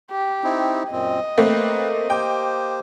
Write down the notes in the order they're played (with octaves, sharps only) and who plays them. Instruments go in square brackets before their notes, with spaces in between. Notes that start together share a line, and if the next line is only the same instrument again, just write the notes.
[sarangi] G4
[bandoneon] C4 D#4 E4
[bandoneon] F#2 A#2 C4 [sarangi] D#5
[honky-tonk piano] A3 A#3 C4 [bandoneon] B4
[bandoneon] A#3 G4 C5 [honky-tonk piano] G5